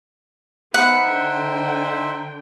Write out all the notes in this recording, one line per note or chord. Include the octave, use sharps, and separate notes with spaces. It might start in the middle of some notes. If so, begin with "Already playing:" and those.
B3 D#4 C5 E5 F#5 B5
D3 G5